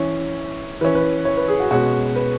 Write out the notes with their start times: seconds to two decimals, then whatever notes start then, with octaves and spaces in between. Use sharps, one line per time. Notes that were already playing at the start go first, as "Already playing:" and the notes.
Already playing: E3 C#4
0.81 E3 C#4 B4
0.95 B4
1.25 C#5
1.37 B4
1.48 G#4
1.60 F#4
1.71 B2 G#3 C#4 F#4
2.16 B4